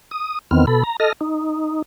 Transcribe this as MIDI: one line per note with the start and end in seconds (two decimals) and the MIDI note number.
0.11 0.39 87
0.51 0.66 40
0.51 0.66 51
0.51 0.66 59
0.51 0.66 60
0.51 0.66 89
0.67 0.83 47
0.67 0.83 69
0.67 0.83 83
0.84 0.97 82
1.00 1.13 69
1.00 1.13 75
1.00 1.13 89
1.00 1.13 94
1.21 1.82 63